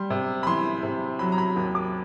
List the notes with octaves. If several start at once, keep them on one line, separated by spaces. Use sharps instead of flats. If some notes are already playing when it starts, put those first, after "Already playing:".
Already playing: G3 C6
C3
B5
E3 C6
C3
F#3 B5
A#5
B5
D#2
D6